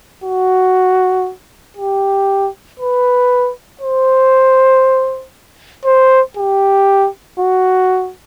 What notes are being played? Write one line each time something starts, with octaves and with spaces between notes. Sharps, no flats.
F#4
G4
B4
C5
C5
G4
F#4